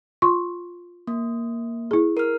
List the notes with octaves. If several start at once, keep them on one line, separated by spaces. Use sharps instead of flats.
F4 C6 C#6
A#3
E4 G#4
A#4 F6